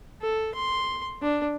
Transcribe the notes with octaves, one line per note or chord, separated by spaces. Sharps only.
A4
C6
D4